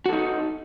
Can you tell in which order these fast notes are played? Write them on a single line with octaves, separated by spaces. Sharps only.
F#4 A4 D#4